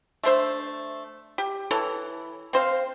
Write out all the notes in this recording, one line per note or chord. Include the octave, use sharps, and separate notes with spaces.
A3 D4 C5 E5
G4
E3 A4 C#5
C4 C5 F5